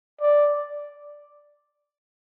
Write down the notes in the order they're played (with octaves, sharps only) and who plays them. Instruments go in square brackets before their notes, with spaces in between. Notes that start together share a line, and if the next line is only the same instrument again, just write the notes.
[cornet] D5